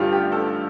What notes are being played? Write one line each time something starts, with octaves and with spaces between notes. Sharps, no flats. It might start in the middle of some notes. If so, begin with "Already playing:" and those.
Already playing: A1 G2 D3 G3 F4 G4
G4
A4